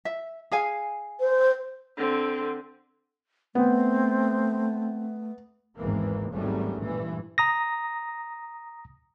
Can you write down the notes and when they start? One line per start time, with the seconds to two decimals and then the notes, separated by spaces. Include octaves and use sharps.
0.05 E5
0.51 G#4 F5 G#5
1.20 C5
1.98 D3 C4
3.55 A3 B3 C4
5.76 G#1 E2 G#2 E3 A#3
6.33 G#1 E2 F#3 G3 A3 C#4
6.82 G2 A#2 E3
7.38 A#5 D#6 A#6